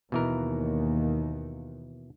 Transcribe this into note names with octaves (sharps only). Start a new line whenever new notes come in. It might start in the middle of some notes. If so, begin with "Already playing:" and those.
D#2 B2 E3 A#4